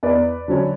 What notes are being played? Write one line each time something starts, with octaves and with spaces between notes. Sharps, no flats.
E2 B4 D5
D3 F#3 C#4